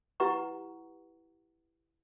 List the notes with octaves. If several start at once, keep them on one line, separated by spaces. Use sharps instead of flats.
E4 G4 B4 F#5 A#5 C#6